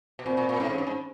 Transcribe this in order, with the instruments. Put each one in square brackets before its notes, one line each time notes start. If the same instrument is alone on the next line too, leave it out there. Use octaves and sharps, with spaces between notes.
[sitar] B2
[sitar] A#2 [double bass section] C4
[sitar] A#2
A#2
[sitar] A2 [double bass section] C#4
[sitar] G#2
G2
G#2